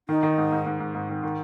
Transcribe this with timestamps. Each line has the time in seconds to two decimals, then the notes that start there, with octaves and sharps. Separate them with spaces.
0.09 D#3 D#4
0.23 D#3
0.38 G#2
0.52 G#2
0.66 G#2
0.80 G#2
0.95 G#2
1.09 D#3
1.23 D#3